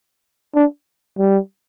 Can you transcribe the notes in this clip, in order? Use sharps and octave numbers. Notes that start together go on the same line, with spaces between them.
D4
G3